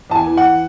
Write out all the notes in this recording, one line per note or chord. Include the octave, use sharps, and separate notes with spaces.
E2 A5
G#5
E3
F#5